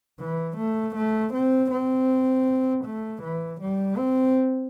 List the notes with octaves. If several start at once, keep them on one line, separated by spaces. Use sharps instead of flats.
E3
A3
A3
C4
C4
A3
E3
G3
C4